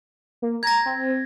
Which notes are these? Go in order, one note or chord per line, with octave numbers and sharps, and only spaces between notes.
A#3
A#5 G#6 A#6
C4